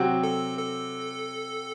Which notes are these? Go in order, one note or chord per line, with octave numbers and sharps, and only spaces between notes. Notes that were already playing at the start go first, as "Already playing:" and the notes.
Already playing: C3 F#3 C4 F#4
A4
A4